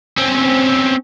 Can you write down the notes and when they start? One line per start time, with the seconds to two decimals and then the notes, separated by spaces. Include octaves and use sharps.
0.17 C4 C#4